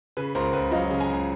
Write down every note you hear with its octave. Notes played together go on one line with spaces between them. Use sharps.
C#3 B4
C#2 A#4 C5
C#2 B4
F#3 D#5 F5
C#3
G#5 A#5
C#2